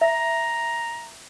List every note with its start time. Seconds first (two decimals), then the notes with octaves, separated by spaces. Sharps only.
0.01 E5 A#5